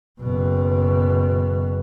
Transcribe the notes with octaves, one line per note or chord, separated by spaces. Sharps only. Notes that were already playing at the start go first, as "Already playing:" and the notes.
F#1 B2